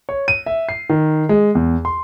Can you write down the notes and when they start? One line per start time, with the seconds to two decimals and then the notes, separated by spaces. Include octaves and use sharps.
0.09 C#5
0.28 D#7
0.46 E5
0.69 C7
0.90 D#3
1.29 G#3
1.55 E2
1.85 C6